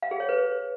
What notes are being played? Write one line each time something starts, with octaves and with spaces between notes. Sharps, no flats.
F5
G#4
C#5
B4